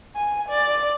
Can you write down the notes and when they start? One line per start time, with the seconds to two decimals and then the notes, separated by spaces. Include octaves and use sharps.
0.16 G#5
0.49 D5